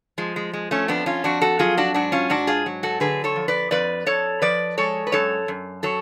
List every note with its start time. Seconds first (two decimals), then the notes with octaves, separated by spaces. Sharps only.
0.18 F3 G#3
0.36 G#3
0.53 G#3
0.71 A3 C#4
0.88 F2 B3 D4
1.06 C#4 F4
1.24 F2 D4 F#4
1.41 F#4 A4
1.59 F#3 F4 G#4
1.77 D4 F#4
1.94 G#2 D4 F#4
2.12 C#4 F4
2.30 G#2 D4 F#4
2.47 F4 G#4
2.66 F#3
2.83 F#4 A4
3.00 D3 G#4 B4
3.24 A4 C#5
3.36 F3
3.48 B4 D5
3.71 F2 B4 D5
4.06 F2 A4 C#5
4.42 F3 B4 D5
4.77 G#3 A4 C#5
5.07 B4
5.12 F#2 A4 C#5
5.48 F#2
5.83 F#3 A4 C#5